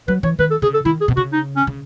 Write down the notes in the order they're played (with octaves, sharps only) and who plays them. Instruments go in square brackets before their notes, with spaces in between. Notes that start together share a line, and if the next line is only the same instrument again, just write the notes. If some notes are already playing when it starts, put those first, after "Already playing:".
[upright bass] F#3 [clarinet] B4
[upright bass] E3 [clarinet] C#5
[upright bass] D#3 [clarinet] B4
[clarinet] A4
[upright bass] C#3 [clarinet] G#4
[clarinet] A4
[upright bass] D#3 [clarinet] E4
[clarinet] G#4
[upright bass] B2
[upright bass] C#3 [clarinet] F#4
[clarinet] D#4
C#4
[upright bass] C#3